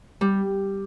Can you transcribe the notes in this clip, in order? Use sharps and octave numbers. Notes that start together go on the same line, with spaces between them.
G3